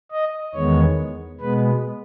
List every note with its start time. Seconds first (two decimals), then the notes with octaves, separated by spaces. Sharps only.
0.12 D#5
0.54 E2 D#3 G#3 B3 C#5
1.41 B2 G#3 B3 B4